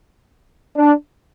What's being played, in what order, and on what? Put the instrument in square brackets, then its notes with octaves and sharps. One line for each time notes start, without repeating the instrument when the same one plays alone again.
[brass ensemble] D4